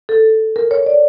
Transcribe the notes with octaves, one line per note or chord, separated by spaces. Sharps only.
A4
A#4
C#5
D5